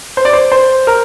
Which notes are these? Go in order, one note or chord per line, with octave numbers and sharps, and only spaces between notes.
C5
D5
C5
C5
A#4